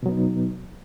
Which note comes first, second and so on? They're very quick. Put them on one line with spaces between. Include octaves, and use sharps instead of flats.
B2 F#3 B3 D#4